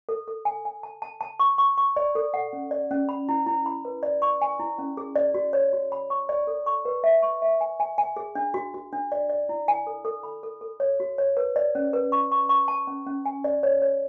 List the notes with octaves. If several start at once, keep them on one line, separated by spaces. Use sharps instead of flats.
A4
A4
G#5
G#5
A5
A5
A5
C#6
C#6
C#6
D5
A4
F#5
C#4
D5
C#4
B5
E4
E4
B5
B4
D5
C#6
G#5
E4
C#4
G#4
D5
F#4
C#5
F#4
B5
C#6
D5
A4
C#6
B4
E5
C#6
E5
G#5
G#5
G#5
G#4
D4
F#4
F#4
D4
D5
D5
E4
G#5
A4
A4
B5
A4
A4
C#5
F#4
C#5
B4
D5
C#4
B4
C#6
C#6
C#6
A5
C#4
C#4
G#5
D5
C#5
C#5